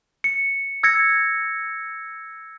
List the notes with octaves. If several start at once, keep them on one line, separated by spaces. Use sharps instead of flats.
C#7
E6 G#6 A#6 C#7